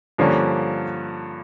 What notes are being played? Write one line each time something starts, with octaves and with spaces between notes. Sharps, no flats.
G2 D3 F3 A#3 C#4